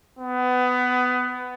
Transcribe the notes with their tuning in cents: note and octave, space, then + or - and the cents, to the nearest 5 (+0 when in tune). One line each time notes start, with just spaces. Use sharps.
B3 +20